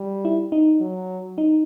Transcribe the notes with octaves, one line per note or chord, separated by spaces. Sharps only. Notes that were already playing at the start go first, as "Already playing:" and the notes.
Already playing: G3
E4
D#4
F#3
D#4